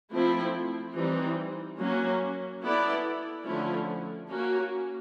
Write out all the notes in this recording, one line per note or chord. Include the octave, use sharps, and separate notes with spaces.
F3 A3 C4 E4
E3 G3 C4 D#4
F#3 A#3 C#4
B3 E4 A4 D5
D3 F3 A3 C#4 E4
A#3 C#4 F#4